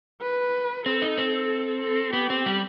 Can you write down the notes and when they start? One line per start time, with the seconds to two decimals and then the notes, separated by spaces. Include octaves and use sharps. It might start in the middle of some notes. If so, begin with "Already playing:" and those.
0.22 B4
0.86 C4 A4
1.02 D#4
1.18 C4
1.81 A4
2.13 B3 G4
2.30 C4
2.46 G3